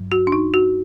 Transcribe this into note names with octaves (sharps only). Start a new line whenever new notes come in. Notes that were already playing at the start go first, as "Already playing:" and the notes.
Already playing: G2 F#3
F#4
D4
D#4
F#4